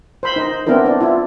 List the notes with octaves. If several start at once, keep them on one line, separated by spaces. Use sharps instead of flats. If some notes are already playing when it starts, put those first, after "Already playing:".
C5 B5
D#4 C5
B3 C4 D4 E4 A#4
D4
E4 F4